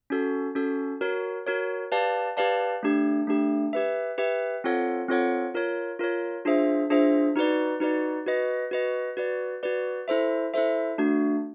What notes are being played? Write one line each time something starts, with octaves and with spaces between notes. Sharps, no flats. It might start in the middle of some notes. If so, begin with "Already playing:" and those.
C#4 F#4 A4
C#4 F#4 A4
F#4 A#4 C#5
F#4 A#4 C#5
G4 B4 D5 F5 A5
G4 B4 D5 F5 A5
A3 D4 G4
A3 D4 G4
G4 B4 E5
G4 B4 E5
C4 F4 A4 C#5 F#5
C4 F4 A4 C#5 F#5
F4 A#4 C#5
F4 A#4 C#5
D4 F4 G#4 C5 E5
D4 F4 G#4 C5 E5
D#4 F#4 B4 D5
D#4 F#4 B4 D5
F#4 B4 D#5
F#4 B4 D#5
F#4 B4 D5
F#4 B4 D5
E4 A4 C5 E5
E4 A4 C5 E5
A3 D4 F#4